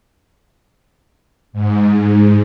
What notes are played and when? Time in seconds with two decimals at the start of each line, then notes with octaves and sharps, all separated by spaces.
1.53 G#2